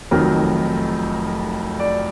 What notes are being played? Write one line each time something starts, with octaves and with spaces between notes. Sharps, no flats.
F1 F2 D#3 F#3 A#4
D5